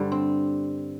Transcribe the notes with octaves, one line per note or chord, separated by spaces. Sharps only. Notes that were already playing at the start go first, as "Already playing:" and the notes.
Already playing: G2 D3 G3 C5
C4